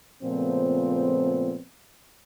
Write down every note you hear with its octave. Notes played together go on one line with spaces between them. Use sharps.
A#2 C#3 F3 A3 B3 C4